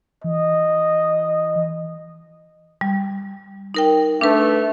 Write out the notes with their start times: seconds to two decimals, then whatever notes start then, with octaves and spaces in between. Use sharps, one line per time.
0.24 E3 D#5
2.81 G3
3.74 D#4 A#4 G5
4.21 A3 D4 B4